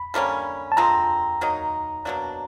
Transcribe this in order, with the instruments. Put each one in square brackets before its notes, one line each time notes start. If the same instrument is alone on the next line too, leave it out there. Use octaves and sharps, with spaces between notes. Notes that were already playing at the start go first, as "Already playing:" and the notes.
Already playing: [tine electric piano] B5
[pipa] D3 G3 A#3 C#4
[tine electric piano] A5
[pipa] D3 F3 G#3 C4 [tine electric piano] A#5
[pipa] D#3 F#3 A#3 D#4
B2 F#3 A#3 D4